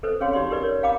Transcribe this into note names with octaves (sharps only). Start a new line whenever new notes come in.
A4 B4 C5
C#4 G#4 C#5 F5 G5 C6
D#4 G4 D5 C6
G4 A#4 B4 D5
C#5
F5 G5 A#5 B5 D6